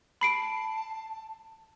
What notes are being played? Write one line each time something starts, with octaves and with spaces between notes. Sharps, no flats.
A5 B5 C7 D7